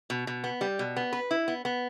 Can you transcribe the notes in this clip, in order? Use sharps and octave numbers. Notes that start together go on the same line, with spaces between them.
B2
B2
B3
G3
B2
B3
B4
E4
B3
B3